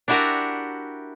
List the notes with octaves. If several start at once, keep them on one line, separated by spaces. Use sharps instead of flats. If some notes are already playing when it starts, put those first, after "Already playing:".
D4 E4 F#4 G4 A#4 E5